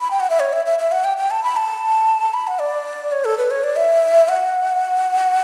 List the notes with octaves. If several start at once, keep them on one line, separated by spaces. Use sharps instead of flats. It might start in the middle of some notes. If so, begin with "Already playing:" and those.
B5
G5
F#5
E5
C#5
E5
E5
E5
F#5
G5
G5
A5
B5
A5
B5
F#5
D5
C#5
A4
B4
C#5
D5
E5
F#5